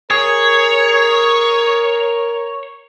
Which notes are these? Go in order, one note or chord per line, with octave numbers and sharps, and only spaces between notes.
G#4 A#4 C#5